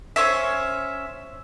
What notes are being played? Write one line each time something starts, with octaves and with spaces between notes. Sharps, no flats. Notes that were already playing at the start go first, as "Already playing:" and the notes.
C#4 C5 C#5 E5